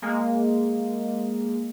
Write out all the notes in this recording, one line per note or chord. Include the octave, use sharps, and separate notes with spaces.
G#3 A#3